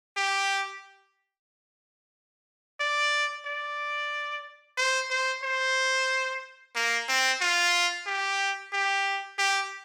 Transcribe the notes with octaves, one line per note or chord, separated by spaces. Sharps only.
G4
D5
D5
C5
C5
C5
A#3
C4
F4
G4
G4
G4